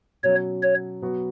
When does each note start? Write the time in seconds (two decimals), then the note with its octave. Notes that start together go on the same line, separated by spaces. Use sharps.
0.23 B2 F#3 C#4 C#5
0.62 C#5
1.02 B2 F#3 B3 F#4